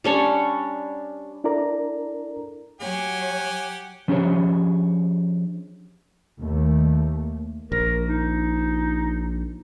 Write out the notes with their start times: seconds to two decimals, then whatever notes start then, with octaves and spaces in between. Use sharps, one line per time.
0.04 G3 C#4 D4 C#5
1.44 D4 E4 A4 A#4 D5 A#5
2.81 F#3 G4 C#5 F#5 G#5
4.08 F3 C#4 D4 G4 G#4 C#5
6.39 D#2 A3
7.72 A#1 A#4
8.07 D#4